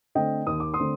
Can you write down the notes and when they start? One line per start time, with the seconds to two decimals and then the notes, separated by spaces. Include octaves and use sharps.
0.15 D3 A3 C4 D#5 G5
0.47 D#2 D#6
0.60 D6
0.74 C6 D#6
0.80 D3 A3 C4